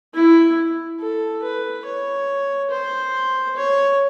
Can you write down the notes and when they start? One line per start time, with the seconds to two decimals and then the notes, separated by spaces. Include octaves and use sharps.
0.14 E4
1.00 A4
1.43 B4
1.85 C#5
2.71 C5
3.56 C#5